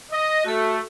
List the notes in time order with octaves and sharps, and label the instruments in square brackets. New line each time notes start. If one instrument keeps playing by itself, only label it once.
[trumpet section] D#5
[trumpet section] A3 [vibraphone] F#4 A4